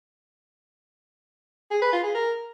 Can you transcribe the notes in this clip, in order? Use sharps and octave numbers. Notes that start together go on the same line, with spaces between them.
G#4
B4
F4
G#4
A#4